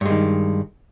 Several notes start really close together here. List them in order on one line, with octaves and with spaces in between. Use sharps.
G2 G#3 D#3